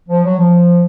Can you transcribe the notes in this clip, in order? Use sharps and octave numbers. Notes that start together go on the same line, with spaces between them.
F3
F#3
F3